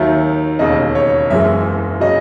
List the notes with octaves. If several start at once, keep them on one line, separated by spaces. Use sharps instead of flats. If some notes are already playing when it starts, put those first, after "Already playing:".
Already playing: D#2 D#3 F#3 E5
E1 D#2 C#3 D#5
C#5
F#1 F#2 E3 G#3 E5
C#3 F#3 D#5